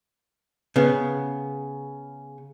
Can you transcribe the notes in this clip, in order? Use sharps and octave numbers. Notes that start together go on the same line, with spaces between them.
C#3 B3